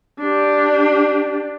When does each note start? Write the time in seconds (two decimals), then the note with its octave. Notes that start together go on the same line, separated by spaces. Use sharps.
0.20 D4 G4